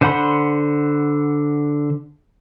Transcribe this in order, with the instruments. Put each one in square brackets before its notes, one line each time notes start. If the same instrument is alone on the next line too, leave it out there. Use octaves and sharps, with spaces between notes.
[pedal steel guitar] D3 C5 F#5 B5 C6